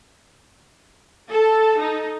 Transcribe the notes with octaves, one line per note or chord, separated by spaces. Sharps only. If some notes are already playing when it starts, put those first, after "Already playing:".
A4 A5
D#4 A4